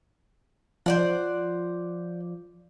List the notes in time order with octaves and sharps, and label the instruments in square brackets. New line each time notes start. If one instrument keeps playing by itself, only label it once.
[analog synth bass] F3 [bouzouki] C5 D5 F#5